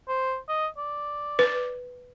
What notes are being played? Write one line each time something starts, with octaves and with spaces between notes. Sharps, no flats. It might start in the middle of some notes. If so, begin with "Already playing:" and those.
C5
D#5
D5
B4